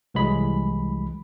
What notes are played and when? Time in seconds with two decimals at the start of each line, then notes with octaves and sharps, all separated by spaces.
0.14 C2 E3 F#3 G#3 B5